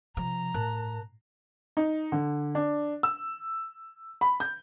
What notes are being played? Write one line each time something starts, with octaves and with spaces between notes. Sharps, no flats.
C3 F3 A#5
A2 A#4 A5 F#6
D#4
D3
D4
E6
B5
G6